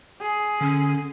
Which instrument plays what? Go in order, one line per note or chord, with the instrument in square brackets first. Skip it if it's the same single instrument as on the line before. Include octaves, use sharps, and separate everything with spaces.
[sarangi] G#4
[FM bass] D3 [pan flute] C#4